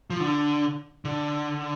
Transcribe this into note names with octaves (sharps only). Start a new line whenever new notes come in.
F3
D3
D3